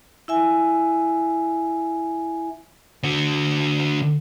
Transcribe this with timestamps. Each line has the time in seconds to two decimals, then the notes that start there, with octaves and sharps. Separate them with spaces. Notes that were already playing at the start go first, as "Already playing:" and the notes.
0.28 E4 E5 G#5
3.04 D3 F#4